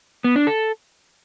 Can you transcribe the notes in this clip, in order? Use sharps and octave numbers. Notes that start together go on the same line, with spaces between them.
B3
D4
A4